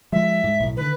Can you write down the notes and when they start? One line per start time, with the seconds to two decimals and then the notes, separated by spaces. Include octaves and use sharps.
0.12 F3 G#3 E5
0.43 G#2
0.60 B1 A2
0.77 D3 D#3 B4